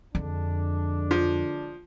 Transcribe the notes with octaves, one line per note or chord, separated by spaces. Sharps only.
F2 D3 G#3 D4
F3